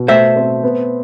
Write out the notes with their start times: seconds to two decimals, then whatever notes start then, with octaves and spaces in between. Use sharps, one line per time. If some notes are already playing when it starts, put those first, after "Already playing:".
Already playing: B2
0.08 A3 C5 E5
0.36 C4
0.64 B3